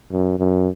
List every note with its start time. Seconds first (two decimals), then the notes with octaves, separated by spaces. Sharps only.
0.12 F#2
0.39 F#2